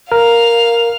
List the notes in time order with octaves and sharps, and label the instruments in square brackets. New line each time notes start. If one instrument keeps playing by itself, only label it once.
[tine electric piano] A#4 [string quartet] F5 F6